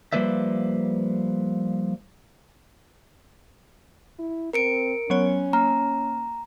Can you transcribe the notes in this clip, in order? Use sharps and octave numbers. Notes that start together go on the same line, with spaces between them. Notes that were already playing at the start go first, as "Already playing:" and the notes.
F3 G3 A#3 B4 D5 E5
E4
C4 A#4 C#7 D7
F#3 B3 C#4 C#5
A#3 A#5